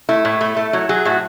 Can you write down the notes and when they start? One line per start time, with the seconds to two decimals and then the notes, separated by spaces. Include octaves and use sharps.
0.09 A3 E4
0.25 A2
0.41 A3
0.56 A3
0.73 F#3 E4
0.89 F#3 G#4
1.05 A2 F#4